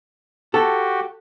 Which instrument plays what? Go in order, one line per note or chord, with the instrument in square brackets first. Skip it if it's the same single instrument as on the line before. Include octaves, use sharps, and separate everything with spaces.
[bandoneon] F#4 G4 [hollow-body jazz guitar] A4